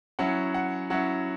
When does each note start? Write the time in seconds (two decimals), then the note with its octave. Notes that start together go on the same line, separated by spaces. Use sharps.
0.19 F#3 C#4 E4 F#5
0.54 F#5
0.90 F#3 C#4 E4 F#5